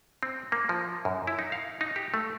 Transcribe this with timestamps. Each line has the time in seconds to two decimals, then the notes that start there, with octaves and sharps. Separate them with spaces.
0.23 C4
0.52 A#3
0.69 F3
1.05 F#2
1.27 E4
1.39 D#4
1.52 F5
1.81 D#4
1.96 G4
2.14 A3